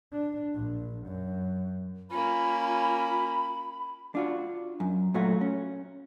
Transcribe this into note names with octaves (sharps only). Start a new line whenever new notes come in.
D4
A#1
F#2
A#3 C#4 F4 B5
D4 F4 F#4
F#2
A#2 F#3 A3 F4 F#4
C#4